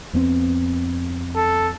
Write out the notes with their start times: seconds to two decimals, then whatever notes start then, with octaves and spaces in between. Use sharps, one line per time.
0.13 F2 B3 C4
1.36 A4